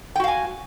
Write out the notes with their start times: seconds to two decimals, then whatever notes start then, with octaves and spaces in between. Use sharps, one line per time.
0.16 G5
0.20 F#4
0.24 F5
0.28 G#5